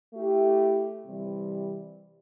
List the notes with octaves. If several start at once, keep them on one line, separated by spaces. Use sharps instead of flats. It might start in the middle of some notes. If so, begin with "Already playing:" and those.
A3 E4 G4
C3 E3 G3